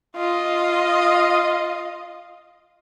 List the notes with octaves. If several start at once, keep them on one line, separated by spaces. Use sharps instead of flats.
F4 D#5